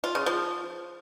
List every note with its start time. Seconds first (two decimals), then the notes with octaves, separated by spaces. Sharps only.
0.04 F4
0.15 C#3
0.26 F3